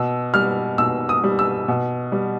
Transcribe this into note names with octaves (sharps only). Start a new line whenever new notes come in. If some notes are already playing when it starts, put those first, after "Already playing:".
Already playing: B2 E6
G3 F6
B2 E6
D#6
G3
E6
B2
G3